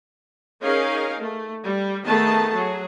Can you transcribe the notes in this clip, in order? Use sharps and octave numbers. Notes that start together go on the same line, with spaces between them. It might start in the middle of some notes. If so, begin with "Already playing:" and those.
C#4 D#4 G#4 A#4 F5
A3
G3
D#3 A3 B3 G#4 A5
F#3 G#4